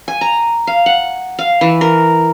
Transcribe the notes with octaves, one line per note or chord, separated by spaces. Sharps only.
G#5
A#5
F5
F#5
F5
E3
A#4